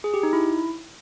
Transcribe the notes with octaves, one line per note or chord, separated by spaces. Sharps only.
G#4
G4
D#4
E4